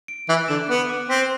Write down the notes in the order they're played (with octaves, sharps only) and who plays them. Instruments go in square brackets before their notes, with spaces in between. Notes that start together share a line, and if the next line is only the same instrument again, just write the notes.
[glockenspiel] D7
[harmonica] E3 [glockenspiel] F#6
[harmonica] D3 [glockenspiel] E7
[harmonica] B3 [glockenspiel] F#6
[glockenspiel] D6
[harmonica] C4 [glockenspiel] B6